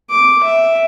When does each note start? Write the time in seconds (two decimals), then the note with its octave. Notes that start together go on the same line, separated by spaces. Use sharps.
0.10 D6
0.44 E5